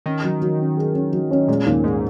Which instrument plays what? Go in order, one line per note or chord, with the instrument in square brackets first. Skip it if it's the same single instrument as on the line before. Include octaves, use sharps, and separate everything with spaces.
[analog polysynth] D#3 [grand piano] C#4
[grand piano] F#3
F#3
C#4
G#4
C#4
F#3
C#4
[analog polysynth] A#2 [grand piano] G#3
[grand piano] D#2 [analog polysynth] A#2
[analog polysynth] G#2 [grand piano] G#3